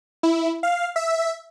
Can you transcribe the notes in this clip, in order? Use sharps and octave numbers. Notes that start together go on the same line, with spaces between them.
E4
F5
E5